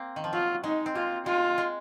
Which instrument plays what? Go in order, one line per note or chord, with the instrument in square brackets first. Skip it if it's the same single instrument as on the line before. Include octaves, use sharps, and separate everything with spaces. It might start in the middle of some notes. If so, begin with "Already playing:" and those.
Already playing: [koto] A#3 C4
D#3
F3
[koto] F#3 [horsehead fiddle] F4
[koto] G#3 [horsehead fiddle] D#4
[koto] C4
[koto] A#3 [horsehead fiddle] F4
[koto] G#3 [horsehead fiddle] F4
[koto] G#3